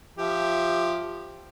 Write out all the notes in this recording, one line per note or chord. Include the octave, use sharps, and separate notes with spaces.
F3 G4 E5